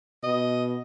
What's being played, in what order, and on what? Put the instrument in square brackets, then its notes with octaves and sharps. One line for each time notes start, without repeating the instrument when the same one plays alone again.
[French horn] B2 [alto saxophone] D#5